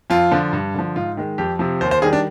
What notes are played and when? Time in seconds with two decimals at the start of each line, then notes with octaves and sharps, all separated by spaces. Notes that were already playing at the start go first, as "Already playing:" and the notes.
0.10 F2 F4
0.31 D3 F3
0.53 G2
0.74 D3 F3
0.96 G#2 F4
1.17 D#3 G#3
1.38 F2 G4
1.59 C3 F3
1.81 D#2 C5
1.91 C5
2.02 D#3 G3 G#4
2.13 D4